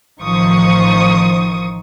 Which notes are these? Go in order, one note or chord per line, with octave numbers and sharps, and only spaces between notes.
A1 D#3 F3 C5 C#6 D#6